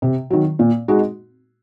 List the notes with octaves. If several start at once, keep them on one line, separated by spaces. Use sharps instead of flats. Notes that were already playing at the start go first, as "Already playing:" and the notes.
C3
D#3 F#3
A#2
G#3 D#4 F#4